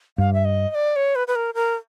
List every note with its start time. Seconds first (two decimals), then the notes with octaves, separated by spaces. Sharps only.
0.18 G2 F5
0.33 E5
0.45 D#5
0.70 D#5
0.75 D5
0.96 C#5
1.15 B4
1.28 B4
1.35 A#4
1.55 A#4